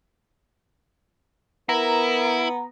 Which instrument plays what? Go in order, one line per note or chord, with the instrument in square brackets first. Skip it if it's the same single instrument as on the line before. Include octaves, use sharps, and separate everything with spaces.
[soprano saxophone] B3 [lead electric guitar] E4 [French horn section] A#4 [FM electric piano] A#5